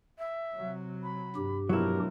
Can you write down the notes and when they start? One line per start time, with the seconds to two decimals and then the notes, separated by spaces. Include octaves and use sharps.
0.18 E5
0.56 C3 F#3
1.03 B5
1.36 G2 G4
1.69 F1 B2 F3 F#3 E4 A#4